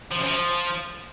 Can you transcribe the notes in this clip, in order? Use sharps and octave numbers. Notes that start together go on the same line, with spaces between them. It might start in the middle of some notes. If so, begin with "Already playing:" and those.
F3
F#2
F3